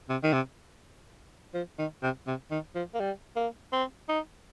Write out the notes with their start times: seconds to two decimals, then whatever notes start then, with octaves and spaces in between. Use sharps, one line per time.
0.09 C3
0.23 D#3
0.33 C3
1.54 F3
1.79 D#3
2.03 C3
2.27 C3
2.51 D#3
2.75 F3
2.94 A#3
3.00 G3
3.36 A#3
3.72 C4
4.08 D#4